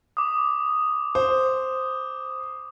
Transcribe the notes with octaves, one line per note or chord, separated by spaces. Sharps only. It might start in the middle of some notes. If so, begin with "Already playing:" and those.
D6 D#6
C5